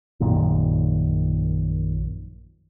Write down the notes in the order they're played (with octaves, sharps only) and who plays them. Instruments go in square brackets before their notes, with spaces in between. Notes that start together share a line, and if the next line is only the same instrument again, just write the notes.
[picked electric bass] A#1 F#2 A#2 D#3